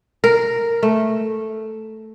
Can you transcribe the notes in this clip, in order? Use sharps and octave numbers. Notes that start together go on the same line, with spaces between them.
A#4
A3